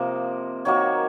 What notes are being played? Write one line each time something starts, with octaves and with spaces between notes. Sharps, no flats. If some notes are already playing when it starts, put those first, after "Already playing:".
Already playing: C3 F3 A#3 D#5
D#3 F#3 A#3 C#5